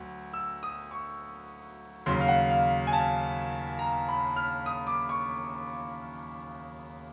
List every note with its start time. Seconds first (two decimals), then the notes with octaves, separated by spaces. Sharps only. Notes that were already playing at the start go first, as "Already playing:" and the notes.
Already playing: D2 F#3
0.33 E6
0.63 D#6
0.91 C#6
2.06 D#2 C#3 F#3 C6
2.21 F5
2.28 F#5
2.50 F5
2.87 G#5
2.93 A5
3.79 A#5
4.08 B5
4.36 F6
4.66 D#6
4.87 D6
5.09 C#6